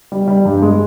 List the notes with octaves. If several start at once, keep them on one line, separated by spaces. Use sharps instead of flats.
G3
G3
G2
G#3